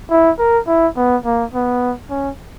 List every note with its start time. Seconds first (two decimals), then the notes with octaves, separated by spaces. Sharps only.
0.11 E4
0.39 A#4
0.67 E4
0.96 B3
1.25 A#3
1.54 B3
2.10 C#4